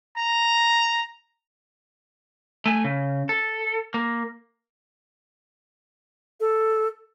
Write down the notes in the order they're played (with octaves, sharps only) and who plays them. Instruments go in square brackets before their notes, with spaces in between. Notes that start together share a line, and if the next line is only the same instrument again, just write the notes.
[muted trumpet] A#5
[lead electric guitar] A3 G#5
C#3
A4
A#3
[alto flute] A4